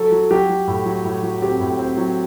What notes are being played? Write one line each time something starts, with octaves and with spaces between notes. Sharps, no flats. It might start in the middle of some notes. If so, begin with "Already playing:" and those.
Already playing: F#3 A4
F#3
F#3 G4
F#3
A2
F#3
A2
F#3
C4 G4
A2
C4
F#3